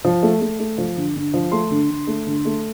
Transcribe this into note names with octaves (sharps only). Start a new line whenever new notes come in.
F3
A3
A3
A3
F3
D3
D3
F3
A3 C6
D3
D3
A3
D3
A3